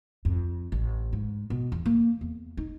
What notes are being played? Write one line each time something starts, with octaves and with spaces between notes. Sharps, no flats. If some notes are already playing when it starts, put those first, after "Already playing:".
F2
A1
G#2
B2
E2
A#3
E2
D#4